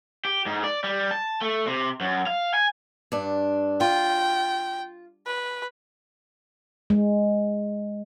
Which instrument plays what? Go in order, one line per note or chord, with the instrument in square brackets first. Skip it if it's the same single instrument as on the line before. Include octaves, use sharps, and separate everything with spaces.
[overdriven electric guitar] G4
G#2
D5
G3
A5
A3
C3
F#2
F5
G#5
[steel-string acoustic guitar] G2 D4
[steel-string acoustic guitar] F4 [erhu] G5
[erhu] B4
[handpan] G#3